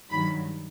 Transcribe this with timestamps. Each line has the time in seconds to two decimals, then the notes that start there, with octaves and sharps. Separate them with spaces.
0.10 G2 D#3 F#3 B5